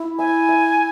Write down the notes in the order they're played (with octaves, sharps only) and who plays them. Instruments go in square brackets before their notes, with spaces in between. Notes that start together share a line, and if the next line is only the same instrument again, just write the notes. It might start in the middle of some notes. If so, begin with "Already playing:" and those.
Already playing: [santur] E4
[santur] E5 [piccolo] G#5
[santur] E5